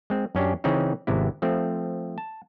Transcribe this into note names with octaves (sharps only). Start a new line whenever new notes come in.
G#3 C4
F#2 C#4 D4 G4
C#3 E3 C4 C#4 D#4
G#1 C3 B3 E4
F3 A3 C4
A5